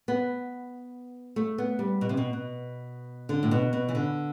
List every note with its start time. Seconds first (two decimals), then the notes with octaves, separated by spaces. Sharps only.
0.08 B3
1.36 A3
1.58 B3
1.79 G3
2.01 B2
2.09 C3
2.17 B2
2.33 B2
3.29 D3
3.43 A2
3.51 B2
3.73 B2
3.89 E3
3.95 D3